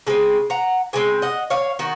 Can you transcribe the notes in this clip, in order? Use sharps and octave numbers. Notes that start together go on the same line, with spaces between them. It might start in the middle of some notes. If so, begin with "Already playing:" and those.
C#3 G#3 C4 G#5
F#5 A#5
C#3 G#3 C4 G#5
D#5 F#5
C#5 F5
D#3 F#4